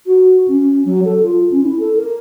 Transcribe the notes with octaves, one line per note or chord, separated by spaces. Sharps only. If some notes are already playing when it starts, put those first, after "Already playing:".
F#4
C#4
F#3
A4
F4
C#4
E4
A4
A#4